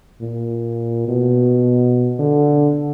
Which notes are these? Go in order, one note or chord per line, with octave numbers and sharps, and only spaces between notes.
A#2
B2
D3